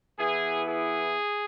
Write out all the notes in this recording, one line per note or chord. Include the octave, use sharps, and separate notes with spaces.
E3 B3 E4 G#4
G#4